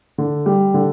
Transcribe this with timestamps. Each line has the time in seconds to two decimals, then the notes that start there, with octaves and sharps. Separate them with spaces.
0.18 D3
0.46 G3
0.74 D3